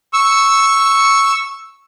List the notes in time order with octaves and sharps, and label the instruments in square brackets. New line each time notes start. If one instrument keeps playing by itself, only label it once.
[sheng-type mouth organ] C#6 E6